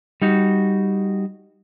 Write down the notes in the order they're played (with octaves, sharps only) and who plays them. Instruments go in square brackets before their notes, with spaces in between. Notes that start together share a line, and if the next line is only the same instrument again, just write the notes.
[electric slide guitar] G3 D#4 F#4